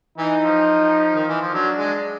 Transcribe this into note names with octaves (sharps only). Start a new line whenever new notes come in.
E3 D#4
F3
D#3
E3
F3
F#3 D4
G#3